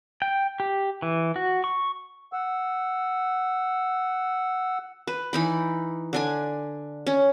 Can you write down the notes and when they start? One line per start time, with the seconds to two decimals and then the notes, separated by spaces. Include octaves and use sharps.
0.22 G5
0.60 G4
1.02 E3
1.36 F#4
1.64 C#6
2.33 F#5 E6
5.07 B4
5.33 E3 D#4 B5
6.13 D3 D4 G#5
7.07 C#4